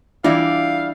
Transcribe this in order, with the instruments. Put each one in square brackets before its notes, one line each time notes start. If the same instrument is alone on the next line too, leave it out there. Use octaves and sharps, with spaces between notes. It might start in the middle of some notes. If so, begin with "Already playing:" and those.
[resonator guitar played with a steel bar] E3 G3 D5 [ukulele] D4 E4 [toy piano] F4 E5 [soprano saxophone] F5